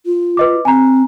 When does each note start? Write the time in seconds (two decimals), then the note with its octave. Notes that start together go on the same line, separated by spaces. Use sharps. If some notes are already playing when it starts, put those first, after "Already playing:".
0.06 F4
0.37 B4 D#5 D6
0.65 C4 G#5 A#5